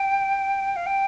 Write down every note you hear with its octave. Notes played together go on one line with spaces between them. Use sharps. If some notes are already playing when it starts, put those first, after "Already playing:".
Already playing: G5
F5
G5